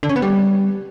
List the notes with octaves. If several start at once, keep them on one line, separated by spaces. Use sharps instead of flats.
D3
C#4
B3
G3